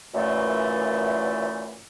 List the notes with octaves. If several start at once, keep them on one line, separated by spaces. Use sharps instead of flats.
F#2 A#2 E3 A3